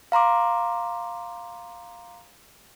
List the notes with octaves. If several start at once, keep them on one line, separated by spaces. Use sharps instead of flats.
F5 A#5 C6 D6